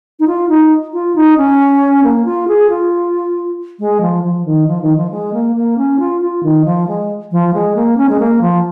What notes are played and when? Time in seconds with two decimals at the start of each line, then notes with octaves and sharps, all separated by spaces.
0.19 D#4
0.27 F4
0.49 D#4
0.93 F4
1.15 D#4
1.37 C#4
2.03 A#3
2.25 F4
2.48 G#4
2.69 F4
3.79 G#3
4.01 F3
4.23 F3
4.45 D#3
4.67 F3
4.82 D#3
4.96 F3
5.10 G#3
5.33 A#3
5.55 A#3
5.77 C#4
5.99 F4
6.21 F4
6.43 D#3
6.65 F3
6.87 G#3
7.31 F3
7.53 G#3
7.75 A#3
7.97 C#4
8.09 G#3
8.19 A#3
8.41 F3